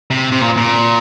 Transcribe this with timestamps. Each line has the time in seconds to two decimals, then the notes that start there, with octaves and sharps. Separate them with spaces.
0.10 C3
0.32 C3
0.41 A#2
0.57 A#2